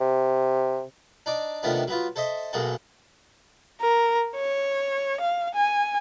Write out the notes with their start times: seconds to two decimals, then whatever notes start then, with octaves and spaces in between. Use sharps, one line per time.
0.01 C3
1.26 D4 D#4 D6
1.63 C3 D#3 F3 A3 B3 D4
1.87 F#3 B3 F4
2.16 A4 C5 D#5 E5
2.53 B1 F#2 A#3 F#4 G#4 A4
3.81 A#4
4.36 C#5
5.21 F5
5.55 G#5